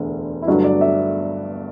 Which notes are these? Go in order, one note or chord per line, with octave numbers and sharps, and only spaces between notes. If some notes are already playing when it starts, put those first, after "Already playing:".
Already playing: E1 D2 D3
E4
G1 G2 F#3 A3 F#4
D5
E5